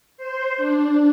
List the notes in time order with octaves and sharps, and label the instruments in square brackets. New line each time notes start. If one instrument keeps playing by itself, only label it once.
[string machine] C5
D4